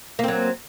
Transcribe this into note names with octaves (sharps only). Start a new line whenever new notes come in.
F#3 A#3 C4